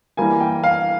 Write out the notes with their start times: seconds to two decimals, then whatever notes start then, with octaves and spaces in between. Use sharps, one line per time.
0.17 E3 G3 A#3 G#5
0.40 G5
0.64 F5